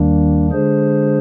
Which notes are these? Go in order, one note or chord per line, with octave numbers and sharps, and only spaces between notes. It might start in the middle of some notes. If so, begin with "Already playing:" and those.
Already playing: D#2 D#3 G3 A#3 D4
D3 G#3 D4 G#4 C5